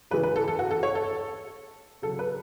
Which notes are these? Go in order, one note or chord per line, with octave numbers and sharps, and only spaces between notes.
C#3 E3 G#3 B4
B4
A4
A4
F#4
A4
C#5
A4
C#3 F#3 A4
B4